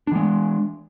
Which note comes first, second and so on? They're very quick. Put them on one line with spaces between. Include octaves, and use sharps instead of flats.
D4 E3 G#3